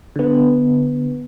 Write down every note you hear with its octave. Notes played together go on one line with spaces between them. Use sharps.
D3 B3